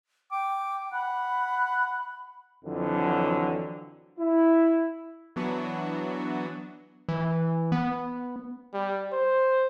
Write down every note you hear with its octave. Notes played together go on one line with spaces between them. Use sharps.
G5 D6
F#5 B5
F2 D3 E3 F#3
E4
E3 F#3 B3 D4 F#4
E3
B3
G3
C5